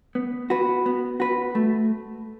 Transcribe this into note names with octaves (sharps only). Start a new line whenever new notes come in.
B3
F#4 B4
B3
F#4 B4
A3